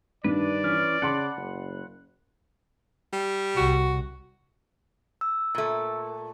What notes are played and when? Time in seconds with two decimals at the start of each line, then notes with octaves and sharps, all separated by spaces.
0.24 G2 D#3 D4 B4 D5
0.64 E3 C#4 B4 F6
1.02 C#3 F#5 A5 B5 C6
1.37 F#1
3.13 G3
3.56 C2 F#4
5.21 E6
5.55 A#2 A3